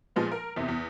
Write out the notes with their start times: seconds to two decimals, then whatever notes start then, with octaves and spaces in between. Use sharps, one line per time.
0.16 A#2 F3 G#3 B3
0.32 A#4
0.56 E2 C3
0.69 E2